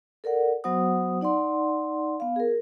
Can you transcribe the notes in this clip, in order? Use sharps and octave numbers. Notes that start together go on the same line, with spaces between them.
A4 A#4 D5 F#5
F#3 B3 F#4 C5 F#5 D#6
D#4 D5 F#5 C6
B3 F5
G#4 A#4